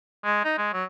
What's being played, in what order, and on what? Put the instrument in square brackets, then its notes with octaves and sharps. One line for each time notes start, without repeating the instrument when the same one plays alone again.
[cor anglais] G#3
D#4
G#3
F#3